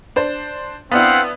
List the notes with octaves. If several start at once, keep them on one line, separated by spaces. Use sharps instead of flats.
D4 C5
B3 C4 D4 E4 F5 F#5